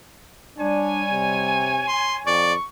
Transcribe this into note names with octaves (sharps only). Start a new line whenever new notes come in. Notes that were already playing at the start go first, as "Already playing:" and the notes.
G3 D4 C#5 G#5
C3
C6
F2 D5 C#6